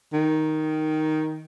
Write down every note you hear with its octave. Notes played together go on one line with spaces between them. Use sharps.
D#3